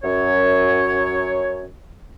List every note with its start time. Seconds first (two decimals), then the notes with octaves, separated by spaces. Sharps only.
0.03 F#2 C#5